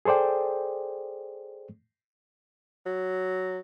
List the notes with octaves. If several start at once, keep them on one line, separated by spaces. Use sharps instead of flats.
G#4 A4 C5 D5 G5
F#3